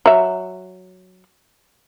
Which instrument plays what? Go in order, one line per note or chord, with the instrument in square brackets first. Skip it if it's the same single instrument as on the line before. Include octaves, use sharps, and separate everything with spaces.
[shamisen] F#3 E5